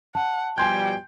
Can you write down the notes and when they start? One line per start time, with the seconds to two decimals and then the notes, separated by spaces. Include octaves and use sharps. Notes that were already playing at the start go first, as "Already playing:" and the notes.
0.15 F#5 A5
0.58 B2 F3 G3 G5 G#5 C6 G6 G#6